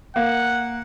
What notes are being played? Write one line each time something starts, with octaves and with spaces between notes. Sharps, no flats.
A#3 F#5